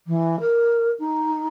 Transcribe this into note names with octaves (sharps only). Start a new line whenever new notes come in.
E3
A#4
D#4